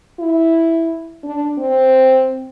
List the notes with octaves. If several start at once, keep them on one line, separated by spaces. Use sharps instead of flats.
E4
D4
C4